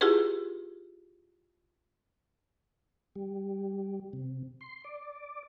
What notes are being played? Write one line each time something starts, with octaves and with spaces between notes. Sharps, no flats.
E4 F4 G4 G#4 B4
G3
C3
C6
D5